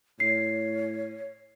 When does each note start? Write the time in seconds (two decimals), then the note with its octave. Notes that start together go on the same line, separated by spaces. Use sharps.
0.20 A2 C#5 C7